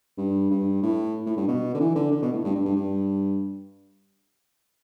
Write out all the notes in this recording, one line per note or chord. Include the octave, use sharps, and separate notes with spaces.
G2
G2
A2
A2
G2
B2
D3
E3
D3
D3
B2
A2
G2
G2
G2
G2